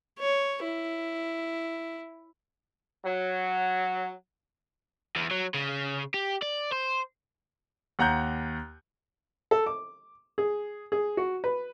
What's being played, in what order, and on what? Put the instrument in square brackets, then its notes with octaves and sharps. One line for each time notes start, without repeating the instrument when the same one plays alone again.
[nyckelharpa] C#5
E4
[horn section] F#3
[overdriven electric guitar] E2
F#3
C#3
G4
D5
C5
[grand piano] D#2 F#5 A#5 F#6 G6
[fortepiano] A4
D6
G#4
G#4
F#4
B4